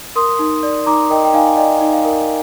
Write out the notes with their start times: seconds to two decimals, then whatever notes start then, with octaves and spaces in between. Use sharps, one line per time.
0.16 A#4 C6 D#6
0.39 D#4
0.63 D5
0.86 D#4 A#5 D6
1.10 A#4 D#5 G5
1.25 G5
1.33 D#4 F5 G#5
1.57 D5 D#5 G5
1.81 D#4
1.93 F5
2.05 A#4